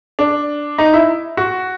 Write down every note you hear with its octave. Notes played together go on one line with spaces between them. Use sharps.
D4
D#4
E4
F#4